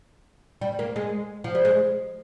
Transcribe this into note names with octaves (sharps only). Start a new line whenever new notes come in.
G3
A#3
G#3
F3
G3
G#3